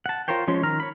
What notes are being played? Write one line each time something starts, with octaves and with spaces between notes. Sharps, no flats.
F#5 A5
F4 A#4 C5 C#5 G5
F3 G#3 C#4 C#5 C6
D#3 A#5 F6
C#5 B5